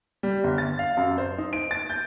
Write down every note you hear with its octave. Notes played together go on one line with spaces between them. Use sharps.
G3
G1
A6
F5
F#2
C5
D#4
D7
A6
G6